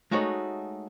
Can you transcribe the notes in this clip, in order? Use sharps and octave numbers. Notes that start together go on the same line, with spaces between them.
G#3 A3 D#4 F#4 C#5